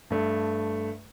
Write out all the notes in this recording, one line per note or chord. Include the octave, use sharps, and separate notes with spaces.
G2 A3